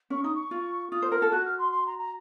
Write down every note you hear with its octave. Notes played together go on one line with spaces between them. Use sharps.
C#4 C#6
D#4 D#6
C#6
F4
F4 D#6
C5
A#4 F6
A4
F#4 F#6
F6
C6
C6
A#5
A#5